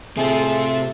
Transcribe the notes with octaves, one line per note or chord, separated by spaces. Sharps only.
A2 C3 C4 F4 G#4 A4 E5